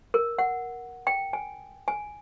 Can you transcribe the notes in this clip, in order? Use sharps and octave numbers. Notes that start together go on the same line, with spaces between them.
A#4
F#5
G5
G#5
G#5